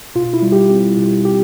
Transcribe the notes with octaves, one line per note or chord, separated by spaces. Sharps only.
B2 F4
E4
G3
G4
C4 G4
B2
B2 G4